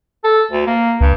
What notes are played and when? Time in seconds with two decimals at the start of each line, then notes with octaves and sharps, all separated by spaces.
0.24 A4
0.51 D2
0.67 A#3
1.01 C#2 G2